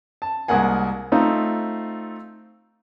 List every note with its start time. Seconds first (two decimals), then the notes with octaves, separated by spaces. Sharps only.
0.22 A5
0.48 C2 G#3 A#3 F#5 G#5
1.12 A3 C4 D#4 F4